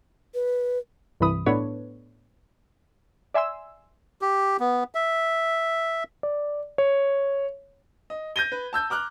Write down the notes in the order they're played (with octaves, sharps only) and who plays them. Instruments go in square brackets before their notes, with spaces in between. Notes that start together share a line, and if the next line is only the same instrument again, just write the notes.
[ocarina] B4
[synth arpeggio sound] C2 G2 E3 B5 D#6
A2 B3 D4 A4 B4 C#5
D5 E5 G#5 C6 E6
[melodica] G4
B3
E5
[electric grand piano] D5
C#5
[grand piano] D#5
G6 G#6 A#6 D#7 G7
B4
A5 E6 G6
A#5 D6 F6 F#6